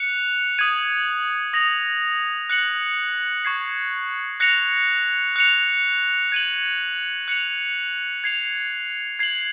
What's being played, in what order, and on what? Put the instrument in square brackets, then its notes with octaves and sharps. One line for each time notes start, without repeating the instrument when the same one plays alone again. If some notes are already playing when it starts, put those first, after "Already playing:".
Already playing: [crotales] F#6 C#7 F7
D#6 G#6 D#7
D#6 A#6 F7
F#6 C#7 F#7
C#6 G#6 C7
F#6 A#6 C#7 F7
F#6 C#7 F7
G#6 D#7 F#7
F#6 C#7 F7
G#6 C7 F7
G#6 C7 F#7